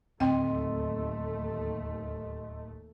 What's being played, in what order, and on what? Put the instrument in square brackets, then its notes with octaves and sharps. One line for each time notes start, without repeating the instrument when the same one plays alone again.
[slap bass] D1 [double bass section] D#2 A3 [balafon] C4 G5 [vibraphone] D#5 C6